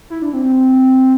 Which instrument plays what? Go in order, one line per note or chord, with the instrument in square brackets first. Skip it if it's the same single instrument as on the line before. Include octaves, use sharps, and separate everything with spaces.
[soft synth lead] E4
D4
C4
C4